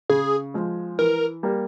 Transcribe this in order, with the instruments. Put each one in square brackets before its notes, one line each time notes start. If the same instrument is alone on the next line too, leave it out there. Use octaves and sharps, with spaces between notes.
[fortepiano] C#3 [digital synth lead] G#4
[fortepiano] F3 G#3
[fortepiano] E3 [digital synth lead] A#4
[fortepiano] G3 A#3